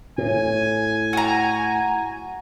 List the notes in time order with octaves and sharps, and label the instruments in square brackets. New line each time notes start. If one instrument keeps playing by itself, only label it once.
[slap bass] A2 [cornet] G#5
[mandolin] F#4 A#5